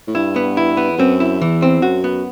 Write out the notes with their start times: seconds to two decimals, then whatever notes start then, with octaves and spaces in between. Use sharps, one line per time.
0.08 A2
0.15 G2 E4
0.36 B3
0.57 E4
0.77 B3
0.90 E2
0.98 F#2 C4
1.20 E4
1.41 E2 E3
1.62 C4
1.82 F#2 F#4
2.04 B3